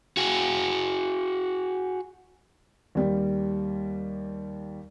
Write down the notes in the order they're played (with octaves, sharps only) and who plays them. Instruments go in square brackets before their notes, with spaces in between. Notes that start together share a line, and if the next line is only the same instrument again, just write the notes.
[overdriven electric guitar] F#4 G#4
[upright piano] D#2 G3